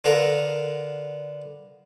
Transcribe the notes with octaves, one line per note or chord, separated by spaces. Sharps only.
D3 B3 F4 A4 A#4